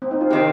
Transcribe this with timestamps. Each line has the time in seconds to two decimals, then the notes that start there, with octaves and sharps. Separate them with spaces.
0.02 C4
0.11 D#4
0.21 F4
0.30 C3 D#3 C4 G4